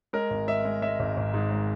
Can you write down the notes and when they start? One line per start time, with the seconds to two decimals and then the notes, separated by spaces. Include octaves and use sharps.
0.13 G#3 A#4
0.30 G#1
0.48 G#3 E5
0.65 G#3
0.82 G#3 E5
0.99 G#1
1.17 G#1
1.34 G#2
1.51 G#3